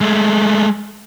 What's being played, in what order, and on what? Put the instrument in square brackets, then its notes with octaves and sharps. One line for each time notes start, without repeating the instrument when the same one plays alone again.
[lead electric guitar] G#3 A3